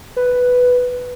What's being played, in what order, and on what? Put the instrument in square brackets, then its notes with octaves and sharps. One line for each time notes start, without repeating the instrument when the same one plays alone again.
[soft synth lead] B4